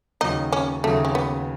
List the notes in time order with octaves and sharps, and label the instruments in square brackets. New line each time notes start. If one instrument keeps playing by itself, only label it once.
[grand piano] D#2 C#3 F#3 [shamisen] D#4
[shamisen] C#4
[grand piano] D#2 C#3 F#3 [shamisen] A3
[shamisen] C#4
B3